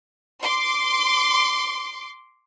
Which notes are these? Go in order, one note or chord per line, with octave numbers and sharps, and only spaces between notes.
C6 D6